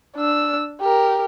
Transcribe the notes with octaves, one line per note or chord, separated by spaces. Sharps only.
D4 E6
G4 A#4